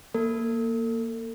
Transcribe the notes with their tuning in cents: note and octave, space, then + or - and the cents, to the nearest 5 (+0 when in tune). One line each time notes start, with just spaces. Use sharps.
A#3 +0 A4 +35